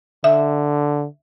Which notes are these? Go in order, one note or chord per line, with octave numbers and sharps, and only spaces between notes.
D3 E5